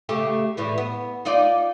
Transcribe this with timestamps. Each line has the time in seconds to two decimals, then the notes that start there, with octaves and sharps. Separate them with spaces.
0.09 C#3 A3 G4
0.57 A2 E3 G3
0.78 B3
1.25 D#4 F4 D5